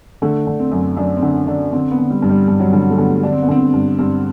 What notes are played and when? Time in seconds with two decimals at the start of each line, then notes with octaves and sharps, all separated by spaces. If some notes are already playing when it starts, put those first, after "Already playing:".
0.22 D3 A3
0.47 D3
0.60 C4
0.71 F#2
0.97 F#2 D4
1.17 C4
1.22 D3 D4
1.48 D3 D4
1.73 D3 C4
1.91 B3
1.98 D3
2.10 G3
2.22 G2
2.29 G3
2.48 G2
2.60 F#3
2.73 D3 G3
2.90 A3
2.98 D3 B3
3.23 D3 D4
3.32 C4
3.43 B3
3.48 D3 C4
3.74 G2
3.99 G2 C4